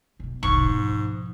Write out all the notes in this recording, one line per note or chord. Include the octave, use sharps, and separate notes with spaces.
B2 D3
E1 C2 G#2 C#6
B2 F3